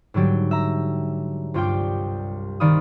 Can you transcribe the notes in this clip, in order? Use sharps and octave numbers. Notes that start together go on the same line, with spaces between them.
G#2 D3 F#3 G3 G4
E5 A#5
C2 G2 F4 G4 G5 D6
C2 D#3 D5 F5 B5 D#6